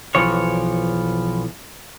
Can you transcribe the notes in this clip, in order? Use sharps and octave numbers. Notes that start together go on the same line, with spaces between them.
B1 E3 F3 C#5